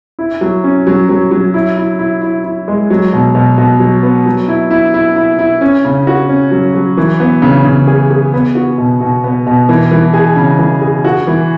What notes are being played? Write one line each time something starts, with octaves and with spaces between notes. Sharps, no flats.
E4
F#3
C#4
F#3
F#3
F#3
E4
E4
E4
E4
E4
G#3
F#3
B2
B2
B2
F#3
B3
F#3
E4
E4
E4
E4
E4
C#4
C#3
F#4
C#4
F#3
F#3
E3
B3
C#3
C#3
G#4
G#4
B3
F#4
B2
B2
B3
B2
E3
E3
G#4
C#3
E3
G#4
F#4
E3